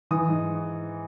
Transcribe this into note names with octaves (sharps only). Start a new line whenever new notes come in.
E3 D#6
G#2